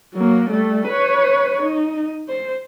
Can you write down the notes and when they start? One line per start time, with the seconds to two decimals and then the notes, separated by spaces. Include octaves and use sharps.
0.14 F#3 A#3
0.50 G3 A3
0.88 B4 C#5
1.62 D#4
2.28 C5